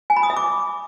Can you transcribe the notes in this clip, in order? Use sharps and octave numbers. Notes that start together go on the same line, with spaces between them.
G#5
B5
D#6
E5
D6